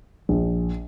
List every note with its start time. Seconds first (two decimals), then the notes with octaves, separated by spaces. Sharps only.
0.29 A#1